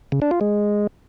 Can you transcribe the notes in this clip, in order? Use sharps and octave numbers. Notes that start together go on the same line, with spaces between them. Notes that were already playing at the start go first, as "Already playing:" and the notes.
C#3
D4
F4
G#3